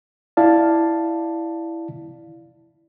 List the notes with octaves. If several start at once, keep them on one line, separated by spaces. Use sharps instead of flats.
E4 D5 F5 A5